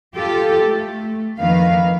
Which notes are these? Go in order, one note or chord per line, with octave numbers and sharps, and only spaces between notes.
F4 G4 A4
A3
F2 D#3 F3 A#3 B4 F5